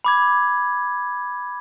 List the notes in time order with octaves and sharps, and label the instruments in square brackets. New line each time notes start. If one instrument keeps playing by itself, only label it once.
[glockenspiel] B5 D6 G#6